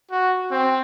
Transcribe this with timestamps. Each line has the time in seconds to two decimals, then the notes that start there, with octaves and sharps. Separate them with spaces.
0.11 F#4
0.51 C4